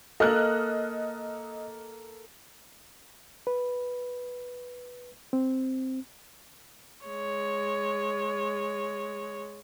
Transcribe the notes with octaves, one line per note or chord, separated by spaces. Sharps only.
A#3 A4 D#5 F6 F#6
B4
C4
G#3 C#5